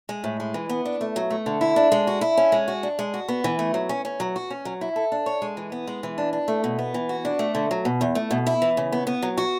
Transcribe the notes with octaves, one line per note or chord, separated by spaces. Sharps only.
G#3
A2
G#3
E3
B3
D4
A3
F#3
A3
D3
E4
D4
G#3
F#4
E4
C#4
G#3
F#4
D4
G#3
F#4
B3
E3
A3
F#3
C#4
C#4
F#3
F#4
C#4
F#3
E4
A4
D4
C#5
G#3
E3
B3
G#3
E3
D4
D4
A3
B2
B3
E3
F#4
D4
A3
D3
F#3
B2
E2
A3
B2
E4
E3
C#3
B3
B3
F#3
F#4